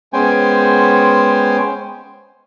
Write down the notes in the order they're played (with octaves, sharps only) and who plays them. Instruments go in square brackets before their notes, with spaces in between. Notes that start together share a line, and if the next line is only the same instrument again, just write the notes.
[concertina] G#3 B3 C#4 C5 G5 G#5